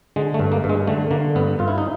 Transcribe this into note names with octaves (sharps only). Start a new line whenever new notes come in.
D3 G#3
A3
G2
A#3
G2
G#3
D3 A3
D3 A#3
G2 B3
G2 F4
E4
D#4